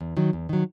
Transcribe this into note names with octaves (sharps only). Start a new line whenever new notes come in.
E2
D#3 F#3
E2
D#3 F#3